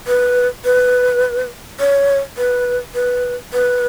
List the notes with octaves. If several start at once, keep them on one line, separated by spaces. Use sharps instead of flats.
B4
B4
C#5
B4
B4
B4